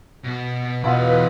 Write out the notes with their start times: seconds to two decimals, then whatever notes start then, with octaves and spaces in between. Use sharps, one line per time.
0.24 B2 F#4
0.84 E2 B2 B3 E4 F4 B4 D#5